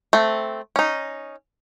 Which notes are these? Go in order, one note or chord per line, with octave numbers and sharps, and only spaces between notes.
A3 C4
C#4 D#4